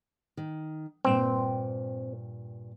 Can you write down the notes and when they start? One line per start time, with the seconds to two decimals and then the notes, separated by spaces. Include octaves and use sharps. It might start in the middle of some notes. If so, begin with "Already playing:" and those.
0.37 D#3
1.05 G2 A#2 C4 G5